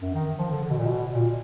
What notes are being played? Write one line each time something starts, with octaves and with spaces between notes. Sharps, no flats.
F#2
D#3
F3
D3
D3
B2
A#2
B2
A#2